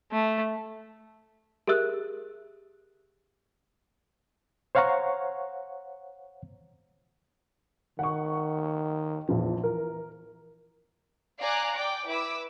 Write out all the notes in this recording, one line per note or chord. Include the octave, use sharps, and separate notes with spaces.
A3
G4 G#4 A#4 E5 E6 F#6
C5 C#5 F5 F#5 A#5 C#6
D#3 F#5 C#6
A#1 E2 F3
E3 A#4
D5 F5 G#5 A#5 D6 F#6
D5 G5 D6
E4 B4 D6 E6